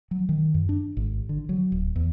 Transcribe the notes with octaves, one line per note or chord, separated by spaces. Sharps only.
F#3
D#3
F#2
D4
G#1
D3
F#3
D1
E2